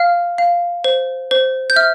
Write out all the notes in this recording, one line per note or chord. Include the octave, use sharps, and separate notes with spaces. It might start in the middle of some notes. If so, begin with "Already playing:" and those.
Already playing: F5 F6
F5
C5
C5
G6
E5 F6